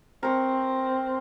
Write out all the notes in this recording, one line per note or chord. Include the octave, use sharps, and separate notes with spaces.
C4 A#4 C#6